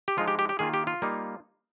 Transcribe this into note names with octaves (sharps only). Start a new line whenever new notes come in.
G4
F3 G#3 D#4 F4
G4
G4
G4
D#3 A#3 F4 G#4
G4
F4
G3 A#3 D#4